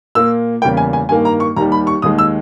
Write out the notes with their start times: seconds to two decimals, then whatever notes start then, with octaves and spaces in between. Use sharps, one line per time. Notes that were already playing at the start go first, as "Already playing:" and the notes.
0.15 A#2 A#3 E6
0.62 E2 C#3 G3 A#3 G5
0.77 G#5
0.93 G#5
1.09 G2 D#3 A#3 G#5
1.25 A#5
1.40 C#6
1.56 D#2 D#3 G3 A#5
1.72 B5
1.87 C#6
2.02 D#2 D#3 G#3 D#6
2.19 E6